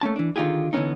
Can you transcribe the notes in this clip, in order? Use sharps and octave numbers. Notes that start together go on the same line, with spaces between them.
A3 A#3 C#4 A5
E3 D4
D3 D#3 D#4 F4 G4 G#4
D3 E3 F#3 B3 C#4 D#4